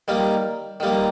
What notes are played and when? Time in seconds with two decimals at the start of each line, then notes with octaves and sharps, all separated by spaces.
0.08 D#3 G3 A#3
0.80 D#3 G3 A#3